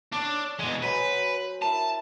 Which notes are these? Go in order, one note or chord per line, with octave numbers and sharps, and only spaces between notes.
D4 C#5 C#6 E6
B2 G#3
F#3 B4 C5 G#5
E4 A#4 A5